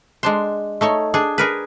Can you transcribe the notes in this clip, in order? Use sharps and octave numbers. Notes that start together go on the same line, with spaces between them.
G#3 D4 C5
A3 D#4 C#5
D4 G#4
G#4 A#4 B4